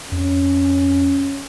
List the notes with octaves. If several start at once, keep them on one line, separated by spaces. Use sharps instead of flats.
F2 C#4